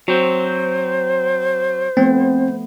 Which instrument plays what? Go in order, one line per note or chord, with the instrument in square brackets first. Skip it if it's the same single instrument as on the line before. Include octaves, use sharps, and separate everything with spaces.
[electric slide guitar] F#3 C4 [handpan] F#4 [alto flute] C5
[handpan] F3 A3 B3 [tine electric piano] C4